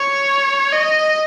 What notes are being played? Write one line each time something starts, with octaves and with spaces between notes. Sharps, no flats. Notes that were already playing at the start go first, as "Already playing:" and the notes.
Already playing: C#5
D#5